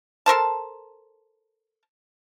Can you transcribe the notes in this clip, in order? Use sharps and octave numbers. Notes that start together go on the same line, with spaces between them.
A4 A#4 C5 A5